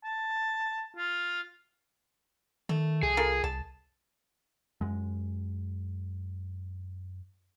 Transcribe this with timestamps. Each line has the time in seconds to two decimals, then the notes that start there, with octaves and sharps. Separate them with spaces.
0.04 A5
0.97 F4
2.69 D#3 A3
3.03 C2 G#4
3.17 F4 A4 A#4
3.44 C2 A5
4.81 F#2 G#3